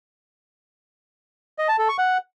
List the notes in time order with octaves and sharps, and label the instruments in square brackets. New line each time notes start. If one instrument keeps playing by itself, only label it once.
[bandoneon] D#5
A5
A4
C#6
F#5